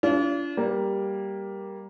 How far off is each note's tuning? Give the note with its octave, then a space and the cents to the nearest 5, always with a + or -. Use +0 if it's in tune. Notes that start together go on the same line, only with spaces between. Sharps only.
D4 -40 F4 -40
G3 +0 A#3 +10